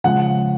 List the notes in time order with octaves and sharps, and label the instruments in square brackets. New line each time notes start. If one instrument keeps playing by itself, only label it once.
[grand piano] C#3 F3 G#3 F#5